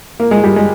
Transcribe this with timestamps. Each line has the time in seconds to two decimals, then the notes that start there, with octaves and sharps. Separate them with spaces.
0.20 A#3
0.31 G#3
0.44 G3
0.56 G#3